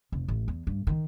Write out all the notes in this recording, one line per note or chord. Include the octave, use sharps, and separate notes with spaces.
F1
A1
E2
G2
D#3